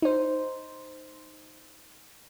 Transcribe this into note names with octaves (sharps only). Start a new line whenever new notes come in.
D#4 C5